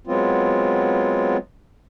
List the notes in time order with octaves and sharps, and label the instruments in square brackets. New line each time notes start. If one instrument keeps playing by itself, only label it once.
[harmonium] F#3 G#3 B3 C4 F4